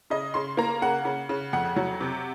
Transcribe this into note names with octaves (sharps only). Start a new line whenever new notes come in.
C#3 D#5
C#3 C6
A#3 A#5
C#3 F#5
C#3
C#3
F2 F#5
F#3
C3